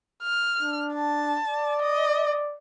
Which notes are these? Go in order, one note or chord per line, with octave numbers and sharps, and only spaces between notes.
F6
D4
A5
D5
D#5